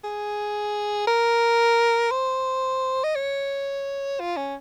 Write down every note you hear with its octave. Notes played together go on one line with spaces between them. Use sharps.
G#4
A#4
C5
D#5
C#5
F4
C#4